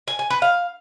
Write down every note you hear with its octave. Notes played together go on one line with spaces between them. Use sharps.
G#5
G#5
B4
F5